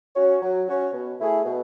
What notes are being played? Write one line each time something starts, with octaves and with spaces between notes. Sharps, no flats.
C#4 F#4 C#5
F#3
C#4 F#4 C#5
B2
A3 E4 G#4
B2